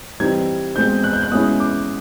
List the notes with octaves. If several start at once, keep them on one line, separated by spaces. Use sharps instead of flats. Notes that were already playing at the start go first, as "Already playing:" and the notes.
E3 G3 C4 D#4 G#6
B2 G#3 C4 G6
F#6
G6
F#6
B2 G#3 C#4 E4 D#6
D6